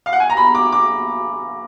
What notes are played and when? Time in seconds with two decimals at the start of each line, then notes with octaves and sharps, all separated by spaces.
0.06 F5
0.13 F#5
0.20 G#5
0.30 A#5
0.37 B5
0.55 D6
0.72 D6